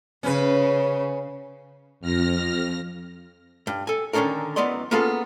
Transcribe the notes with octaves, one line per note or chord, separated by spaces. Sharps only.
C#3 C#4 B4
F2 F6 A#6
G2
A4 G#5
D3 D#3 C#4 D#4 A4 A#4
F#2 E3 B3 D5 D#5 C6
A#3 B3 C#4 F4 G#4 A4